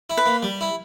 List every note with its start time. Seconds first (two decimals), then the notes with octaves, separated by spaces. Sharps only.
0.10 E4
0.17 B4
0.26 A#3
0.43 G3
0.61 E4